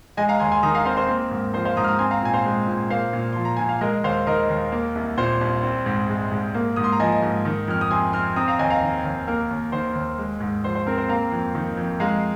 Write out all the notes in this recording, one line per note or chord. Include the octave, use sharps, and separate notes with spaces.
G#3 D#5 G#5
F5 A#5
D#2 G#5 C6
G#5 C6
D#3 A#5 D#6
F5 A#5
C4 C5 F5
C5
A#3
G#2
F3 C5
C5 F5
G#2 A#5 D#6
F6
A#5 D#6
C4 G#5 C6
F5 A#5
A#2 G#5
C5 F5
G#3
A#2
A#3 C5 F5
A#2
F3 C6
A#5
A#2 G#5
F5
G#3 A#4 D#5
D#2 C5 F5
D#3 A#4 D#5
D#2
A#3
C2
A#2 C5
C2
C4
G#2
G#3
G#2
A#3
G#2 D#6
C6
A#5
F3 D#5 G#5
G#2
D#3
F2 F6
D#6
C3 G#5 C6
C4 C6 F6
C4 A#5 D#6
F5 A#5
D#2 D#5 G#5
F5 A#5
D#3
D#2
A#3 A#4
D#2
D#3 C5
D#2
G#3
G#2
F3 C5
C5
C4 A#4
C5
A#3 F5 A#5
F2
D#3
F2
G#3 F5 A#5